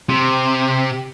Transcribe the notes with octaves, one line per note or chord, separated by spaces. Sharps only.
C3